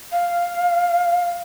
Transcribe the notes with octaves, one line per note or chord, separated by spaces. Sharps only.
F5